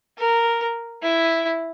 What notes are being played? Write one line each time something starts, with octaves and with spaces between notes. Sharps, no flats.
A#4
E4